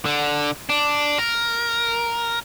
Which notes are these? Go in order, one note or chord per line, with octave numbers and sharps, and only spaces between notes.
D3
D4
A#4